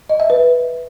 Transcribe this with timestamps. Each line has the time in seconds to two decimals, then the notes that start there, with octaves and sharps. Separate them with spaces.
0.10 D#5
0.20 E5
0.30 B4